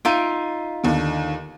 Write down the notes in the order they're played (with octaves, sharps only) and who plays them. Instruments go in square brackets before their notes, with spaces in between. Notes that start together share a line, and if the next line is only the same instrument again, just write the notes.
[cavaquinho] D#4 F4 E5 [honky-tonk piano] D7 D#7
[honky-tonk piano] D#2 D3